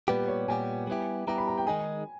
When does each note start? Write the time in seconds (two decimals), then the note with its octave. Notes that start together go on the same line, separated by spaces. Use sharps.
0.08 A#2 G3 B3 G4 B4
0.28 C#5
0.48 A#2 G3 B3 G4 G#5
0.87 G3 B3 E4 G4
1.27 G3 B3 E4 G4 A#5
1.38 B5
1.48 A#5
1.58 G5
1.67 D#3 G#3 D#4 G#4 G#5